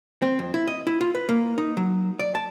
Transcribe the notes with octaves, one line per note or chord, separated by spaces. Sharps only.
C4
F2
E4
D#5
E4
F4
B4
A#3
D#4
F#3
D5
A5